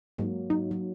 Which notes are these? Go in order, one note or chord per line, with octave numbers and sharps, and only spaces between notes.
G#2 F#3 A#3
F#3 D#4
F#3